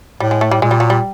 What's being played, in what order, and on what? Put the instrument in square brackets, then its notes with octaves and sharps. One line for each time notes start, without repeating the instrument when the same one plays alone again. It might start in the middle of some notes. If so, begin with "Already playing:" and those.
[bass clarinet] A2 [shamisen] G3
[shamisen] G#3
A3
G3
[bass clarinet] A#2 [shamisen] G#3
[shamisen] G3
F#3
G3